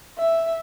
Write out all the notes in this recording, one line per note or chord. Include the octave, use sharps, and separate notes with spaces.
E5